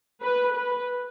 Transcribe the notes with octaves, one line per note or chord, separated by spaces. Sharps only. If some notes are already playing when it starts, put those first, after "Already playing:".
B4
B4